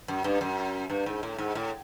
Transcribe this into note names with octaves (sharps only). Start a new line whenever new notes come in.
F#2
G2
F#2
G2
G#2
A2
G#2
A2